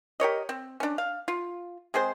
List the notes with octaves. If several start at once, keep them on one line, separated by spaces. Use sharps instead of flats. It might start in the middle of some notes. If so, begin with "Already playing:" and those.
G4 A#4 C#5 D#5
C4
C#4 D4
F5
F4
G#3 C4 G#4 C5